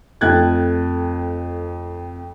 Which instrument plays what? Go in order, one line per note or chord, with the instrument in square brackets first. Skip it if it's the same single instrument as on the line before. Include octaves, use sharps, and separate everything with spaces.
[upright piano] F2 A3 G5 F#6 G#6 A6